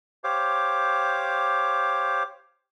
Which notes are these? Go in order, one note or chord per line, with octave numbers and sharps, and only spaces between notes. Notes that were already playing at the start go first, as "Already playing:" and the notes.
G4 C5 C#5 F5 D6